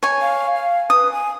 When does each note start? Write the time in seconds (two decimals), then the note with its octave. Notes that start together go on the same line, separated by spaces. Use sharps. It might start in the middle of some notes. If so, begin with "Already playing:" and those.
0.03 C#5 G#5
0.21 F5
0.55 F5
0.90 B4 D#6
1.12 G#5